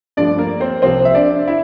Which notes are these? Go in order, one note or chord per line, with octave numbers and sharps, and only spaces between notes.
G2 F3 A3 D4 D5
A#3 A#4
C4 C5
C2 C3 F3 A#3 C4 C5
E5
D4 D5
E4 E5